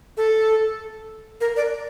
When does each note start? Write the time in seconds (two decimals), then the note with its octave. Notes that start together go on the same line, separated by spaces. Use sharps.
0.17 A4
1.41 A#4
1.57 D5